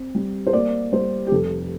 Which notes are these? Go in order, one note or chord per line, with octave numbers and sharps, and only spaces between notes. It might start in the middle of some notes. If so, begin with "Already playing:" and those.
Already playing: C4
G3
C5
A#3 D5
G3 C5
G4
F1 A4